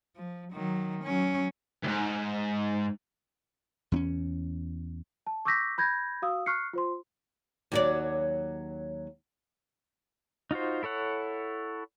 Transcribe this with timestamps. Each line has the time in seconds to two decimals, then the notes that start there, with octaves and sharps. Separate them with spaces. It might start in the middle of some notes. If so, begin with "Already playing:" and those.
0.16 F3
0.53 D#3 F#3
1.04 F#3 C#4
1.84 D2 G#2
3.92 E2 C4 C#4
5.27 A5
5.45 C#6 D6 E6 G6 A#6 B6
5.78 B5 G6 G#6 A#6
6.22 F#4 F5 D#6 E6
6.46 C#6 F6 F#6 C7 C#7
6.73 F4 C5 C6
7.72 D#2 F#3 D5
10.51 D#4 F4 F#4 C5
10.83 E4 A4 C#5 F#5